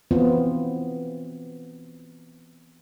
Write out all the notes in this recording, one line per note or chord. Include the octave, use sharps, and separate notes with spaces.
E3 B3 C4 F4